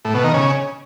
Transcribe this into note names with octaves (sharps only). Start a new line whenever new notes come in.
A2
B2
D#3
C#3